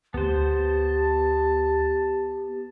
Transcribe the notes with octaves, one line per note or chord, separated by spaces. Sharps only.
D2 B3 G4 C5 A5